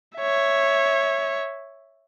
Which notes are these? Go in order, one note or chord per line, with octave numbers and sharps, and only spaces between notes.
C#5 E5